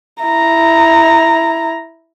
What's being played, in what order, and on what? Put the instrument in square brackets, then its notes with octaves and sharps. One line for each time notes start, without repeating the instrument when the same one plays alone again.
[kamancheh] E4 A#5